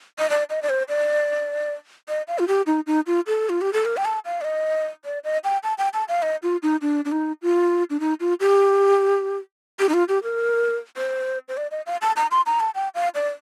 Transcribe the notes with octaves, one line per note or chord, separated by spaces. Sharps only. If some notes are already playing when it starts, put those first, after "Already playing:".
D#5
D5
D#5
D5
C5
D5
D#5
F5
F4
G4
D#4
D#4
F4
A4
F4
G4
A4
A#4
G5
A5
F5
D5
D#5
D5
D#5
G5
A5
G5
A5
F5
D#5
F4
D#4
D4
D4
D#4
F4
D4
D#4
F4
G4
G4
D#4
F4
G4
A#4
C5
C5
D5
D#5
F5
A5
A#5
C6
A#5
A5
G5
F5
D5